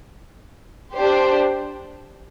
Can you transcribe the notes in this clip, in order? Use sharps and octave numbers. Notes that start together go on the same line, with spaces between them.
D4 G4 C5